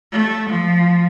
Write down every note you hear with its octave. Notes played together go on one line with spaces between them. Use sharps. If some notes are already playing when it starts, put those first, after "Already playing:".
A3
F3